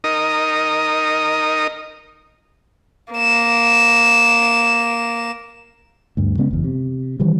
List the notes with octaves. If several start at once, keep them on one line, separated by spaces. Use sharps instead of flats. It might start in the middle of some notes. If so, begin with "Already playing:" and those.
D#4 A#4 D#6
A#3 E7
D2 G2
C#3 G#3 B3 C#4
F#1 E2
C3
D#3 E3 G3